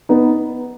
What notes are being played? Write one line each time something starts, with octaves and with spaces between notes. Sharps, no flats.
B3 D#4